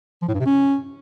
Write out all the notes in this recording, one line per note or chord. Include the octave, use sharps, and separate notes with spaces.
F3
A2
G2
C3
C#4